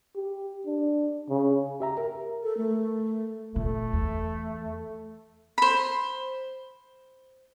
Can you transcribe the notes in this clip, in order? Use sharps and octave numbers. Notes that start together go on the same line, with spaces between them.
G4
D4
C#3
G4 E5 A#5
A#4
A4
A3
A#2 A3
E2
C5 B5